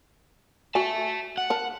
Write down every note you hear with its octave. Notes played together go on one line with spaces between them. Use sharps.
F#4 E5 G#5 A5
F#5
A#4 A5